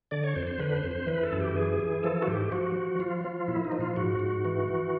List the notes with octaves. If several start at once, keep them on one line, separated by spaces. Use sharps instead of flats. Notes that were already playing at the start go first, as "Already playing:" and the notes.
D3 D5
C#5
F2 C5
C5
D3 B4
C5
F2
C5
E3 B4
A4
F#2
G4
E3 G#4
E3
F3 A4
F#4
G#2 G4
F3 F#4
F3
F3 F4
F3
A#2 E4
D#4
F3
F4
G#2 F#4
G#2
E3
E3